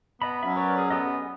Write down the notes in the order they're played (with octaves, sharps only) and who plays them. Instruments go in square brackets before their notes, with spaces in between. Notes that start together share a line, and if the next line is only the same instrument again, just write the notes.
[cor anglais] B3 [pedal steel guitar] D#5 A5 B5
[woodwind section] F#3 C#4 [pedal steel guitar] E5 B5
[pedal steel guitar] A#4 B4 D5 [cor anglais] C#5
[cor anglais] G#4
[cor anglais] B3 [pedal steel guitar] G4 A4 D#5
[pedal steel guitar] D#5 G#5